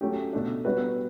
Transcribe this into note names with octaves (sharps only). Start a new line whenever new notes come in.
F#3 A3 C#4 G4
B2 A3 D4
G3 B3 F#4 B4